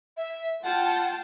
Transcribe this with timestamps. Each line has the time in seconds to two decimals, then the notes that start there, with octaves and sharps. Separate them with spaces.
0.17 E5
0.63 F4 F#5 G5 A5